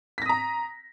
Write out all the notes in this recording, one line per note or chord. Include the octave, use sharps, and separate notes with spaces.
A#5 D#6 A#6 B6